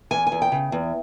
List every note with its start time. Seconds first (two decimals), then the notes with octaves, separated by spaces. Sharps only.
0.11 E2 G#5
0.27 G#5
0.32 E2
0.42 G5
0.52 C#3
0.72 E2